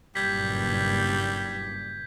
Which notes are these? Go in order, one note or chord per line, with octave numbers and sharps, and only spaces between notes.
F#1 G2 A#2 G3 G6 G#6 B6